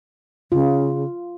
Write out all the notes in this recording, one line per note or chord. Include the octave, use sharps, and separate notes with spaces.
C#3 F4